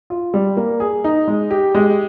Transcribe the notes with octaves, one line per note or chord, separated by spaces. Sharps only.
F4
G3
A#3
G#4
D#4
G#3
G4
G#3